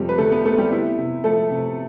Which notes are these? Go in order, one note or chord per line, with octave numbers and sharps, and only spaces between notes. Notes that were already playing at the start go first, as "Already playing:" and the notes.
Already playing: F2 C3 G3 A3 G4
B4
D3 A3 A4
B3 B4
A3 C4 A4
G3 G4
B3 E4
C3
F3 A3 A4
C3